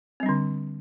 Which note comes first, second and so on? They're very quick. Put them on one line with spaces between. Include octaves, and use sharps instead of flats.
C4 G3 D4 D3